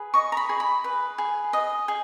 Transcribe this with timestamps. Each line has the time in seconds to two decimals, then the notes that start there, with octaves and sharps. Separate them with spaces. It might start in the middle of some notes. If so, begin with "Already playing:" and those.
Already playing: G#4 B4
0.14 D#5 C#6
0.32 A#5
0.37 B5
0.49 G#4
0.60 B5
0.84 B4
1.18 G#4
1.53 D#5
1.88 G#4